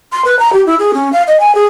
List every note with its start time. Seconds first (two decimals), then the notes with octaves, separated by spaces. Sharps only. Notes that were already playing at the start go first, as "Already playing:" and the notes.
0.12 C6
0.25 B4
0.39 A#5
0.53 G4
0.66 E4
0.79 G#4
0.94 C#4
1.13 F5
1.27 D#5
1.40 G#5
1.55 G#4